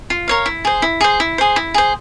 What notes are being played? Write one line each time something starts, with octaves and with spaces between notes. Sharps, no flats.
F4
A#4 C#5 F5
E4
G#4 C5
E4
G#4 C5
E4
G#4 C5
E4
G#4 C5